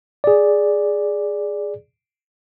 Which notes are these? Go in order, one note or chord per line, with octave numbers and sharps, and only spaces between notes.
G#4 D5